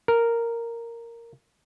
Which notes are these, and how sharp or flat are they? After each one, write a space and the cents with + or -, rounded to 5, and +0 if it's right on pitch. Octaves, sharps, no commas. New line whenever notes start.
A#4 -5